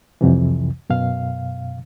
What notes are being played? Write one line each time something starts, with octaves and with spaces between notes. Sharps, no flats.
C2 F2 C3 E3
F#2 B2 F5